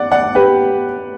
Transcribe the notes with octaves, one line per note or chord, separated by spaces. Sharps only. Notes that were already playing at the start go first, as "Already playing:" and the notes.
Already playing: D5 F#5
D5 F#5
G4 B4